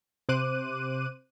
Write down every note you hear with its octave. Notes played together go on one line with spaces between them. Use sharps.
C3 C5 D6 F#6 D#7